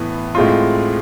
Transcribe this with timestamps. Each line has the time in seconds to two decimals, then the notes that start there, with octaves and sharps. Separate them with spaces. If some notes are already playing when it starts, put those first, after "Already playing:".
Already playing: A2 E3 B3
0.35 A2 G#3 C4 F4